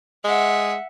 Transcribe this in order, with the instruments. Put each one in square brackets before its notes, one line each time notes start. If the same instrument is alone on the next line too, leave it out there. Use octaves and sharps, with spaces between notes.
[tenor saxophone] G#3 [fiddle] E5 F#5